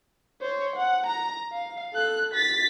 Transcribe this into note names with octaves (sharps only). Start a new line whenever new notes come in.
C5 C#5
F#5
A#5
F5
A4 F#6
A6 B6